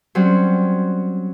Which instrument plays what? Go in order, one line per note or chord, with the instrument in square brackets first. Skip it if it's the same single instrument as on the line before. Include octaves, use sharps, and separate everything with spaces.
[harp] F#3 G3 C4 C#4